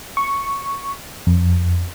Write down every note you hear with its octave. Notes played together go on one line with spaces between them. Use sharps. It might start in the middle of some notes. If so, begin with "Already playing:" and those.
C#6
F2